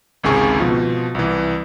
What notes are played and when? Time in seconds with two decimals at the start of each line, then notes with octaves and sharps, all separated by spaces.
0.23 G#1 C#2 C3 G#4 C#6
0.60 B2 F3
1.15 C2 E3